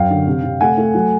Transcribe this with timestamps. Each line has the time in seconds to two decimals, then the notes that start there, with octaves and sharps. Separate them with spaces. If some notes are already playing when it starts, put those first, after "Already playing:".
Already playing: F#2 F5 G5
0.10 D3
0.27 C3
0.44 C3
0.61 A3 F#5 G#5
0.78 A3
0.94 F#3